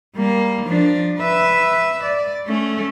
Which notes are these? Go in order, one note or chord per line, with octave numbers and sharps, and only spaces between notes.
G3 A#3
F3 D4
B4 E5
D5
A3 C#4